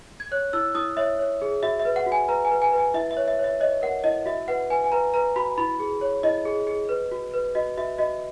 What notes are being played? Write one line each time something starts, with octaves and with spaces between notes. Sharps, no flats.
G#6
C#5 F#6
E4 E6
E4 D#6
C#5 E5
C#5
G#4
F#4 E5
E5
B4
F#5
F#4
G#5
B4 A#5
G#5
B4
G#5
B4
G#5
E4 E5
E5
C#5
E5
C#5
E5
C#5 D#5
A#4 F#5
E4 D#5
F#4 E5
B4 F#5
B4 G#5
G#5
B4 A#5
B4 A#5
F#4 B5
E4 B5
G#4
C#5
E4 D#5
G#4
G#4
B4
F#4
B4
F#4 D#5
F#4 E5
F#4 D#5